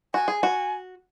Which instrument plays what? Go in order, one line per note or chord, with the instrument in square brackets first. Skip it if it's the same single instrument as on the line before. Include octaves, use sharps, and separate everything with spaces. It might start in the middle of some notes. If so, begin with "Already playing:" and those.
[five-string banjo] F#4 [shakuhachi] G#5
[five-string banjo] G#4
F#4